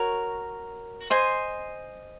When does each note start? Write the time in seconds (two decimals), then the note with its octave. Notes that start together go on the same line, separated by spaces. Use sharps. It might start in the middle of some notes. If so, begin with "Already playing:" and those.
Already playing: F#4 A#4 C#5
1.10 C5 D#5 G#5 C6